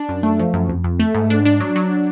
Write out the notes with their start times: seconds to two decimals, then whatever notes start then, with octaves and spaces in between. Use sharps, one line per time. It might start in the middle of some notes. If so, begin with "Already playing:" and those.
Already playing: D4
0.09 F#2
0.23 A3
0.39 F3
0.54 F#2
0.69 F2
0.84 F2
0.99 A3
1.15 G#2
1.30 D4
1.45 D4
1.60 F#3
1.76 F#3